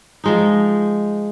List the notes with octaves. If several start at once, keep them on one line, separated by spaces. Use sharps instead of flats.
F3 G#3 D#4